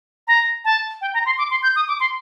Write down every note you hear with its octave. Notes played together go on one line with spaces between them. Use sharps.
A#5
A5
G5
A#5
C6
D6
C6
G6
D#6
D6
C6